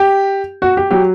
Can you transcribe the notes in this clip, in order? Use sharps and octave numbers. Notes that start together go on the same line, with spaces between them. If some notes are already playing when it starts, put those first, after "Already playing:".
Already playing: G4
F#4
G4
F#3 G4